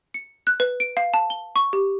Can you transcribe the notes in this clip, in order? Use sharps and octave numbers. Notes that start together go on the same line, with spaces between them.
C#7
F#6
B4
D7
F5
A5
G7
C#6
G4